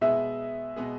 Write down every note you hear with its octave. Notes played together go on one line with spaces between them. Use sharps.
B2 G#3 B3 G#4 E5
B2 G#3 B3 G#4